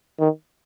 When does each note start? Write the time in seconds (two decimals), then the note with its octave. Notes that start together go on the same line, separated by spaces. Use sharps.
0.20 D#3